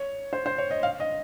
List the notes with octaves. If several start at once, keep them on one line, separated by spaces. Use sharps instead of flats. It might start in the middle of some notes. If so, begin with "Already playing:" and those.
Already playing: C#5
C5
C5
C#5
D#5
F5
D#5